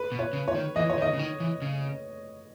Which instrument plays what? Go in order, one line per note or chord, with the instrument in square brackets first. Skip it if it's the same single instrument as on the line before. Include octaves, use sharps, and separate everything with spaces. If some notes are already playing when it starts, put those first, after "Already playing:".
Already playing: [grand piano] B4
[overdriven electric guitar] B2
[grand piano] C#5
[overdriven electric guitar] C#3
[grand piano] C#5
[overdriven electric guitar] D#3
[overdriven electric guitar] E3 [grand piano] D#5
[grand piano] C#5
[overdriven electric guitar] D#3
[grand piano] D#5
[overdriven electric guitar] C#3
D#3
E3
C#3